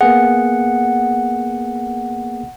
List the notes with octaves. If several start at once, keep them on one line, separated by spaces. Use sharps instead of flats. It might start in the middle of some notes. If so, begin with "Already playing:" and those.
A#3 B3 G#4 F#5